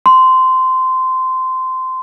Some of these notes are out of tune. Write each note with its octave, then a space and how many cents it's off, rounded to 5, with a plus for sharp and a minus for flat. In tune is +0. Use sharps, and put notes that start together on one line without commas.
C6 -15